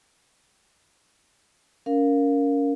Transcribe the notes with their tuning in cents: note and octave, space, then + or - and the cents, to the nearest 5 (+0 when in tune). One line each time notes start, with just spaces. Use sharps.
C#4 +25 A#4 +0 F5 +0